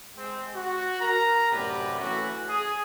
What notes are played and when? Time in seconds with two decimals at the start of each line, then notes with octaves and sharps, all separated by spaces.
0.16 G#3 C4
0.55 F#4
1.00 A#4 A#5
1.51 F#2 A2 C3 B3 G4 D5
1.99 E3 A3 C#4 F#4
2.48 G#4